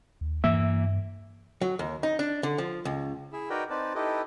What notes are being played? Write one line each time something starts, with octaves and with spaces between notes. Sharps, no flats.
D#2
G2 E3 A#3 E5
F#3
D#2
D#4
D4
D3
F3
C#2
E4 G#4 E5
D#4 F#4 A#4 B4 D5 G5
C4 D#4 B4 D5 A5
D#4 E4 G4 A4 B4 D#5